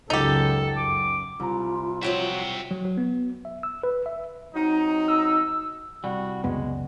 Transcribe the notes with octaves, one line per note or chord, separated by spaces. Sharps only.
C#2 F#2 F#3 D#4 G4 A4
F#2 D6
C2 F4 A#5
F3 F#3 F#4 E5 G5
F#3
F#3
B3
E5
E6
B4
E5
F#3 C4 D#4
E6
C2 G3 F#4
C#2 F#2 G#3 B3